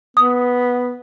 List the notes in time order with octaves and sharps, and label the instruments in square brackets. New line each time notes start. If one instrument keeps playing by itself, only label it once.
[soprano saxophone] B3 [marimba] D#6